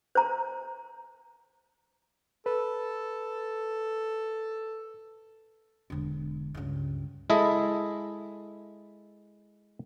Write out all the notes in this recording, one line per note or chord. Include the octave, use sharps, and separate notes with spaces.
C5 A#5
A4 B4
E1 D3
C#2 G2
G#3 E4 A4 D#5 E5